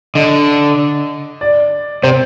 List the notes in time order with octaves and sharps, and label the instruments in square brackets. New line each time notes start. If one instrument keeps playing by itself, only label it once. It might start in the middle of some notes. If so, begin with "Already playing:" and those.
[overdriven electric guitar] D3 [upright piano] D#5
[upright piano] D5
[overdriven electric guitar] C3 [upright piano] C5